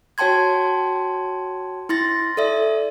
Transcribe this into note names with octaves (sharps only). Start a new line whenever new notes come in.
F#4 C#5 G5 A5 C6 G#6
E4 C6 A6 A#6
A4 D5 E5